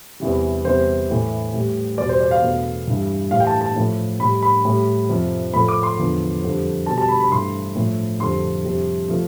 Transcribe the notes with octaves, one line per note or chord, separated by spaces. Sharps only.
E2 C3 E3 G3
E2 C3 G3 C5
A2 E3 A3
A2 G3
E2 B2 G3 D5
C5
D5
F5
E2 B2 A3
G2 E3 G3
A2 E3 G3 F5
G5
A5
A5
A2 F3 A3
A2 G3 B5
B5
A2 G3
F2 C3 F3
A2 F3 A3 B5
D6
C6
E2 D3 F3
F2 D3 G3
B2 G3 A5
A5
B5
B5
G2 E3 A3 C6
A2 F3 A3
F2 D3 G3 C6
F2 C3 G3
F3 A3